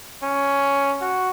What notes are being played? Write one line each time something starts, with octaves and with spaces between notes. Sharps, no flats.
C#4
F#4